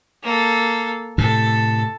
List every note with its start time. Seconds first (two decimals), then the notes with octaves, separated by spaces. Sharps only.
0.23 A#3 A4
1.18 A2 C3 A4